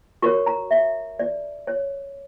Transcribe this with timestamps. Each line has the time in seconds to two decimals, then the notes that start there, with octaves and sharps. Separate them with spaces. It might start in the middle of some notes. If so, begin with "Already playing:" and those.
0.22 F#4 A#4 C#5 C#6
0.46 A#5
0.71 E5
1.19 D5
1.67 C#5